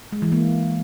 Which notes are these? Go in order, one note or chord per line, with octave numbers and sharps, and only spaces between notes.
G#3
E3
A#3